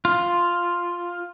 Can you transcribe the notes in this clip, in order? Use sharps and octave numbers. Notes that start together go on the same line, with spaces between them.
F4